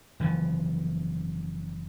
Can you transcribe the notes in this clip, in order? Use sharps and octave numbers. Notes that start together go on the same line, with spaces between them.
F#1 E3 F3